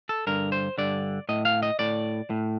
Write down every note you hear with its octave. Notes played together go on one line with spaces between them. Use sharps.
A4
G2 D3 A#4
C5
G2 D3 D5
A2 D#5
F5
D#5
A2 D5
A2